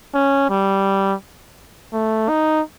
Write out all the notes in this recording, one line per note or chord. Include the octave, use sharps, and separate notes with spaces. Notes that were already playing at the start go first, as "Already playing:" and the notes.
C#4
G3
A3
D#4